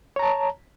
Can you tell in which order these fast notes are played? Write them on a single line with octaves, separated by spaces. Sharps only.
C#5 A#5 A5